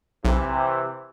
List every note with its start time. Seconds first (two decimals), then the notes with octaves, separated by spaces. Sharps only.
0.25 B1 C3 E3